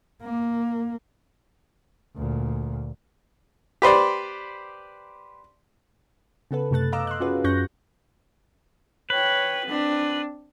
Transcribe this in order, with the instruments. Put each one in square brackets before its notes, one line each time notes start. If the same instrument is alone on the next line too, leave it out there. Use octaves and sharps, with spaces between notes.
[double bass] A#3
D2 A#2
[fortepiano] G4 B4 C5 D5
[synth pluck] C#3 B3 A4 B4
F#2 C3 A3 A4 F#6 A6
D#5 F5 A#5 D6 E6
C6 F#6
C#4 F4 F#4 G#4 B4
F#2 C#4 C#6 F#6 G6 A#6
[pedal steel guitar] B4 [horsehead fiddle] C#5 G5
[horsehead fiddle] C4 D4